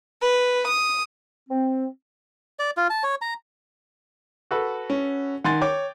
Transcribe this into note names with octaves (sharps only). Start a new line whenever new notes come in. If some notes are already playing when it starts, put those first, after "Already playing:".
B4
D#6
C4
D5
F4
A5
C#5
A#5
F#4 A4 B4
C#4
D#3 F#5 G#5 C6 A6
C#5 G5 D6